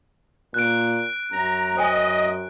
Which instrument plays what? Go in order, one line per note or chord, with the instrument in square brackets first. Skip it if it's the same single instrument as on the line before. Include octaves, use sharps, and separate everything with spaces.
[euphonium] A#2 [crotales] F#6 D7
[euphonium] F#2 [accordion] A#5
[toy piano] C5 G5 G#5 [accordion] D#5